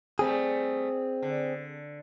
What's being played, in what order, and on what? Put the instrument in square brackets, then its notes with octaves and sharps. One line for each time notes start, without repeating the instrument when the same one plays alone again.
[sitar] G3 A3 [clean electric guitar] C4 G#4
[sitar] D3